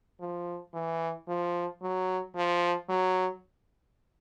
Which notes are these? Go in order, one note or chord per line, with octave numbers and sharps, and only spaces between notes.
F3
E3
F3
F#3
F3
F#3